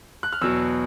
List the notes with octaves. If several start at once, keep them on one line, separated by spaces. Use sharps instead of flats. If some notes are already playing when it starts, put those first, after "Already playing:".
F#6
F6
E2 B2 F#3 E6